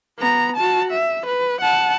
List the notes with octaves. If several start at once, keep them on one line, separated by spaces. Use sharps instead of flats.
B3 A#5
F#4 A5
E5
B4
F#5 A5